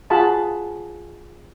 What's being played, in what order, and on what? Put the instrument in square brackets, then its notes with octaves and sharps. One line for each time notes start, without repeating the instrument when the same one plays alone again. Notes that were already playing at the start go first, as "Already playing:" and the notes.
[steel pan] F4 F#4 G#4 F#5 A5 B5